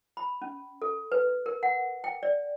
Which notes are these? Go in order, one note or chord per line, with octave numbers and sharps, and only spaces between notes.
B5
C#4
A4
B4
A#4
F#5
G5
D5